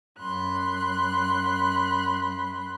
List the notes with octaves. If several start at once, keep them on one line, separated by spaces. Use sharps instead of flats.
F#2 B5 C6 F#6